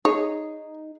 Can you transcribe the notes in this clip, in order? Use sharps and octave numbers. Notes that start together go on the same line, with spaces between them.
D#4 G#4 C#5